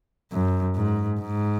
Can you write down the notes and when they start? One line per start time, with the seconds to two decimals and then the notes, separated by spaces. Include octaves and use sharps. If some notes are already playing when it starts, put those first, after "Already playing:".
0.32 F#2
0.76 G#2
1.20 G#2